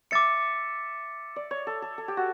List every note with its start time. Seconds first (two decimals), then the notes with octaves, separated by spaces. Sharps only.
0.11 E5 D6 A6 C#7
1.36 D5
1.51 C#5
1.67 A4
1.82 A4
1.98 A4
2.08 G4
2.17 F#4